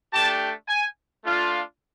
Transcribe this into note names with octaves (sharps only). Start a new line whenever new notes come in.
A3 D4 G4 A5
G#5
A3 D4 F4